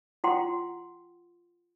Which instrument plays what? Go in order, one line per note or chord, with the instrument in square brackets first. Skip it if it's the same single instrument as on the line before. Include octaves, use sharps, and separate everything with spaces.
[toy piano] F4 F#5 G5 C6